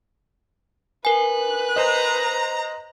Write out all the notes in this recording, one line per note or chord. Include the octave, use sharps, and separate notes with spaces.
A#4 B4 G#5 F#6
C5 D#5 A#5